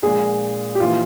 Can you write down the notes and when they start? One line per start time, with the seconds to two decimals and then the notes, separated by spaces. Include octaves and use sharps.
0.03 A#1 A#2 G#3 G#4
0.75 G4
0.80 A#1 E3 F4